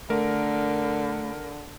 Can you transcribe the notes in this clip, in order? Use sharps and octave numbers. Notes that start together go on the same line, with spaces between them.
D3 A3 A#4